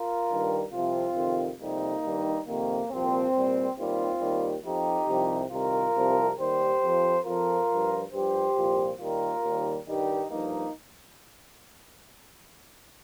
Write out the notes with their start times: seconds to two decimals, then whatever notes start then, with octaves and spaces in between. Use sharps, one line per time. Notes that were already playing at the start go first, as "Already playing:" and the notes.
Already playing: F4 A#4
0.29 G2 D#3 G3
0.72 C2 C3 F3 C4 F4
1.15 F2 C3 D#3
1.59 F2 C3 G3 A#3 D#4
2.03 G2 D#3 G3
2.46 F2 C3 D#3 A#3
2.90 C2 A#2 F3 C4
3.33 C2 A#2 G3
3.76 D#2 D#3 G3 C4 F4
4.20 D#2 D#3 G3
4.64 F2 F3 D#4 G4
5.07 C2 C3 F3
5.51 C2 C3 D#3 F4 A#4
5.94 C2 C3 F3
6.37 D#2 D#3 G3 G4 C5
6.82 F2 F3
7.24 F2 F3 F4 A#4
7.69 G2 F3
8.12 G2 F3 G4 C5
8.55 C2 A#2 F3
8.99 D#2 D#3 G3 F4 A#4
9.42 D#2 D#3 G3
9.86 G2 D#3 G3 D#4 G4
10.30 G2 F3 A#3 D#4